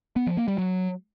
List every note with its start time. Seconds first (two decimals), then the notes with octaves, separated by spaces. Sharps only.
0.16 B3
0.27 F3
0.37 A#3
0.48 G3
0.58 F#3